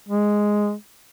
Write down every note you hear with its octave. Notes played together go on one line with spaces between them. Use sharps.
G#3